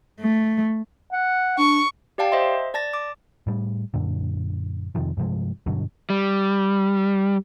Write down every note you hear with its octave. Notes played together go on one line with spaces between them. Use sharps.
A3
F#5
D4 C#6
G4 D5 F5 G5 A5
C5 D#5 E5 C6
D5 A5 A6 A#6
D6
A2 G3
F#2 A#2 D3
F2 C3 D#3 F3
G2 C3 F3 G#3
G2 B2 D3 F#3
G3